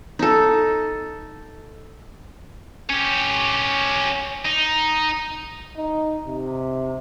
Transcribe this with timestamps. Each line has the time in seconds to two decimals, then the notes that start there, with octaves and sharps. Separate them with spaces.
0.19 D#4 A4
2.89 C#4 G4
4.45 D#4
5.77 D#4
6.27 C3